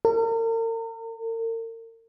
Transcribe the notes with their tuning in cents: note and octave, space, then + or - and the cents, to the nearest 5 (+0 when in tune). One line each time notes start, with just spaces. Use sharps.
A#4 -40